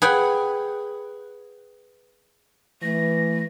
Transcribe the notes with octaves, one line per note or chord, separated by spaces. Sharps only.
G#4 B4 F#5 G5
E3 A3 A#6